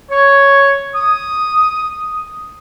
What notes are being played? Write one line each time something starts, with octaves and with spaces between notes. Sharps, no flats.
C#5
D#6